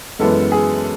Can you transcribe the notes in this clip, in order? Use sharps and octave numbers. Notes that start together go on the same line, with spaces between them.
F#2 E3 G#3 B3 A4
G#4